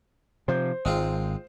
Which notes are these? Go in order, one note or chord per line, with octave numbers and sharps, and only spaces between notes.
C3 F3 C5
G#1 G#3 C4 F4